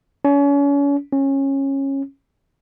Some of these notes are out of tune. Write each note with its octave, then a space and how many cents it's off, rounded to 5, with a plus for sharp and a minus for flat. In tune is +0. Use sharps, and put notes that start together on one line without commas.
C#4 +35
C#4 -20